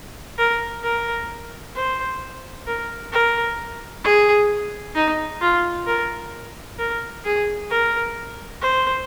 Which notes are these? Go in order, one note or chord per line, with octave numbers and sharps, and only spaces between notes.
A#4
A#4
C5
A#4
A#4
G#4
D#4
F4
A#4
A#4
G#4
A#4
C5